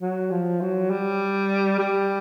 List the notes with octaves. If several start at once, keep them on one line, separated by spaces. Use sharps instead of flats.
F#3
F3
F#3
G3
G3